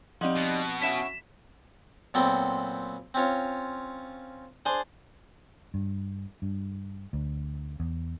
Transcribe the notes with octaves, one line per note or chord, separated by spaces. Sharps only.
F3 G3 C4 D#4 F#5
B2
C#4 E4 F#4 B6 E7
A#2 F#3 B3 C4 A4 G5
C4 C#4 F4 C#5
D4 G#4 C5 G#5 A5 C6
G2
G2
D2
E2